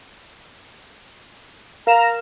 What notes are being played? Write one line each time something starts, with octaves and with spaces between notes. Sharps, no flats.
A#4 F5 A#5 E7